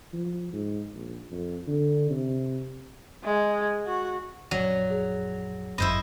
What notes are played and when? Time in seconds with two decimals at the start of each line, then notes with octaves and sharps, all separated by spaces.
0.13 F3
0.53 G#2
0.94 A#1
1.31 F2
1.67 D3
2.10 C3
3.24 G#3
3.86 F#4
4.51 A#1 F#2 F#3 C#5 D5
4.90 G#4
5.78 G1 F#2 E4 C5 D#5 B5